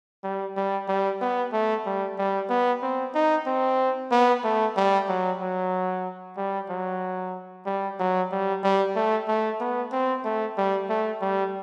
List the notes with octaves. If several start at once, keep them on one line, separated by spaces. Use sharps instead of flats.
G3
G3
G3
B3
A3
G3
G3
B3
C4
D#4
C4
B3
A3
G3
F#3
F#3
G3
F#3
G3
F#3
G3
G3
A3
A3
B3
C4
A3
G3
A3
G3